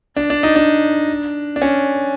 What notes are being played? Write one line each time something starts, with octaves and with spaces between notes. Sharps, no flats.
D4
D4
D#4
D4
D4
C#4